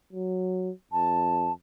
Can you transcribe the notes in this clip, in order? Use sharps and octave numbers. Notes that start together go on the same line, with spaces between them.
F#3
F2 A5